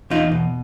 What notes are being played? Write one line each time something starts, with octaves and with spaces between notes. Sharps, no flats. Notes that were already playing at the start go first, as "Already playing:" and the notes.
E2 D#4 F4
B2